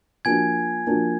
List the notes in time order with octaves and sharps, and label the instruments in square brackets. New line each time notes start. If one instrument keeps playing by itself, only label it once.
[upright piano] F3 A#3 D4 F#4 [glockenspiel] G#5 G#6
[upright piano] F3 A#3 D4 F#4